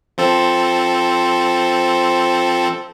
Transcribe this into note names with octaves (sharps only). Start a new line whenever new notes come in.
F3 C4 A4